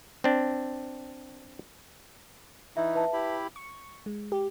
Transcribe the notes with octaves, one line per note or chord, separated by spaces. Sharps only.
C4 D4
E3 D#4 E4 E5
B4 E5 A5
E4 G4 B5
C#6
G#3
G4